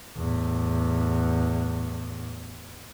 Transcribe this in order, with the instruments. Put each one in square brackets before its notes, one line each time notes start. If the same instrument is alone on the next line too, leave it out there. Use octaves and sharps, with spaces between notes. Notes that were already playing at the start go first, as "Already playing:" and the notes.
[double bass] E2 A2